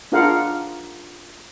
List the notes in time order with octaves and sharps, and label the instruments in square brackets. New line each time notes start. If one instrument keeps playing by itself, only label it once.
[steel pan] D4 F4 G#4 A#4 F5 F#5